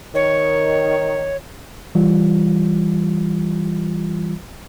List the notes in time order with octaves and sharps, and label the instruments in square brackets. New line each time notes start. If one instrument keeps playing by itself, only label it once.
[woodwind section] D#3 [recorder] C#5
[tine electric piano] E3 G3 F4